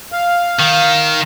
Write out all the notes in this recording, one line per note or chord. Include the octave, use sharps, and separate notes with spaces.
F5
D#3